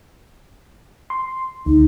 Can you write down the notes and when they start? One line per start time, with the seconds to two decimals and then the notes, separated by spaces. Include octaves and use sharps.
1.10 C6
1.66 D2 D#4